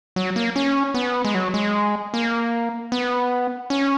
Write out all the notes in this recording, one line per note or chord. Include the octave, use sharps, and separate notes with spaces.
F#3
A#3
C#4
B3
G#3
F#3
G#3
A#3
B3
C#4